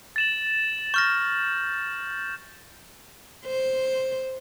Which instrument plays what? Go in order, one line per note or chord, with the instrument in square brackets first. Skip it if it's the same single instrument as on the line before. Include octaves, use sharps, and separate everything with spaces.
[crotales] A6 E7 F#7
[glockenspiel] C#6 F6 A#6 [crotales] G6
[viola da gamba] C5